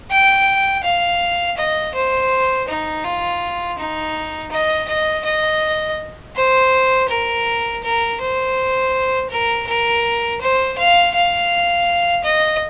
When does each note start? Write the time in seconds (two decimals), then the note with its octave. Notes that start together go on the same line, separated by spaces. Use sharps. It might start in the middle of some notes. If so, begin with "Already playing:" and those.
0.11 G5
0.84 F5
1.58 D#5
1.95 C5
2.69 D#4
3.04 F4
3.78 D#4
4.52 D#5
4.89 D#5
5.25 D#5
6.36 C5
7.09 A#4
7.83 A#4
8.20 C5
9.30 A#4
9.67 A#4
10.41 C5
10.78 F5
11.15 F5
12.24 D#5